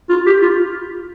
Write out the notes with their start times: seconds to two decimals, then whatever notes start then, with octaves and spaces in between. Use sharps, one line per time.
0.10 F4
0.26 G4
0.42 F4